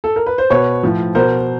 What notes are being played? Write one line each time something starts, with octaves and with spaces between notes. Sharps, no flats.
A4
A#4
B4
C5
B2 B4 C#5
A2 F3
B2 A#4 C5